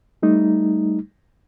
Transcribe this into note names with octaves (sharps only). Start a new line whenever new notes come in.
G3 A3 D#4